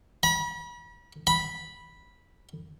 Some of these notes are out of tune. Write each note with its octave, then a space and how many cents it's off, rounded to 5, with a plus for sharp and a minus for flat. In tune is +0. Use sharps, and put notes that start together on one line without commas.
B5 -40
B5 -10